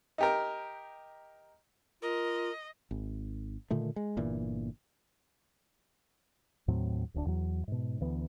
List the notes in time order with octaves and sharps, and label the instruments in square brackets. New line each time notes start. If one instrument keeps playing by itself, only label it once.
[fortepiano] D#4 G4 A#4
[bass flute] F4 [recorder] A#4 [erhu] D#5
[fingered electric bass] G#1
A#2 D3 D#3 A3
G#3
G1 A#2 E3
D#2 A2 F#3 C4
D1 D2 C#4 D4
E2 F#3
G#2 B2
D2 E3 B3